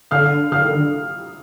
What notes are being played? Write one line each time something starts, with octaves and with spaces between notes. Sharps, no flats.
D3 F5 F6
D3 F5 F6
D#3
D3